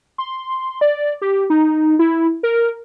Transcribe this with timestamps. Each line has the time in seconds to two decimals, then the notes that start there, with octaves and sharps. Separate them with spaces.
0.18 C6
0.81 D5
1.22 G4
1.50 D#4
1.99 E4
2.43 A#4